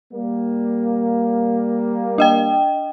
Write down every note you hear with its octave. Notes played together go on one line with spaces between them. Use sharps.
G3 A#3
D4 D#5 G5